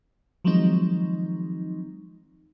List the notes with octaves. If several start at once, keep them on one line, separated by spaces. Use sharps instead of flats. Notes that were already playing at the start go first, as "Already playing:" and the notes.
D#3 F3 F#3 G#3 C4 D#4